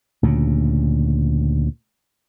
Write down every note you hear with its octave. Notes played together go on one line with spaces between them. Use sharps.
D2 A#2 C#3